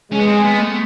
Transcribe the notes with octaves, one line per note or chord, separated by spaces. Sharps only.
G#3 C#4
B3
C4
B3
A3